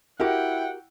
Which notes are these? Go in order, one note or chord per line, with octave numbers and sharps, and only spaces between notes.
E4 F#4 G4 A#4 F#5 G5